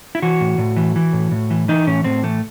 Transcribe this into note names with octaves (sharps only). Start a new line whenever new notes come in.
E4
E3 F#4
A2
A2
E3
E3
A2
A2
E3
E3 D#4
A2 C#4
A2 C4
E3 A3